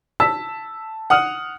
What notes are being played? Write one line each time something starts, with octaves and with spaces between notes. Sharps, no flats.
A5 E6 B6
F#5 D#6 F6